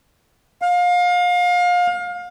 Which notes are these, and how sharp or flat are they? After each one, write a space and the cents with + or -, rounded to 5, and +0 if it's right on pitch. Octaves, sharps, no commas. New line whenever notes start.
F5 +30